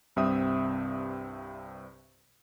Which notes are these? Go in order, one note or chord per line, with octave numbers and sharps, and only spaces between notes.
C2 G2 C3 C4 E5 D#6